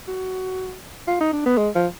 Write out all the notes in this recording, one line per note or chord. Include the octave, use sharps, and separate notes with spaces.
F#4
F4
D#4
D4
B3
G#3
F3